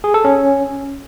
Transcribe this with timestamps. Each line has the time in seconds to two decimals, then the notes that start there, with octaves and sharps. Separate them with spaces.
0.04 G#4
0.14 A4
0.25 C#4